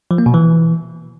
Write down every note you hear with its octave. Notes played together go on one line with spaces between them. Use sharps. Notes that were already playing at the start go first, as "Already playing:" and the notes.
F3
A#3
B2
E3